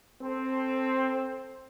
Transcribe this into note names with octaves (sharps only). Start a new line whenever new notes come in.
C4 A4